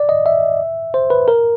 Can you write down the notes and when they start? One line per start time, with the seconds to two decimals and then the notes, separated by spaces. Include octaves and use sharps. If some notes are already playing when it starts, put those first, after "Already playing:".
Already playing: D5
0.09 D#5
0.26 E5
0.94 C5
1.10 B4
1.28 A#4